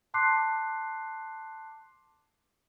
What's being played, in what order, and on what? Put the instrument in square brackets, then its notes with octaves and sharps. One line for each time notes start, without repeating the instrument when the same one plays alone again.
[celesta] A5 C6 D6 F#6 C7